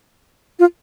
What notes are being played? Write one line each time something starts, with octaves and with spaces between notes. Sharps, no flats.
F4